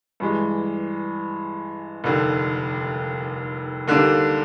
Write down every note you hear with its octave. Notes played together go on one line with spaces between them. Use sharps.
G2 E3 G#3
F1 D#2 D3
D#2 D3 G3 A#3 D4